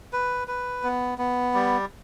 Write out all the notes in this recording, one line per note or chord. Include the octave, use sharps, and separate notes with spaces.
B4
B4
B3
B3
G3